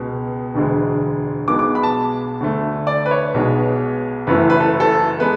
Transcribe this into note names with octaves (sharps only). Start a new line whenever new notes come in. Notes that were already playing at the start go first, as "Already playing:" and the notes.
Already playing: C#2 B2 G#3
E1 D2 D3 G#3
B1 B2 G#3 B3 D6
D6
B5
A5
D2 D3 A3
D5
B4
C#5
B1 B2 G#3
F#1 F#2 E3 A3 B4
B4
A4
A4
G#3 B3 B4